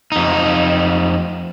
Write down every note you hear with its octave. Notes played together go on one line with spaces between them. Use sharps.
F2 D#4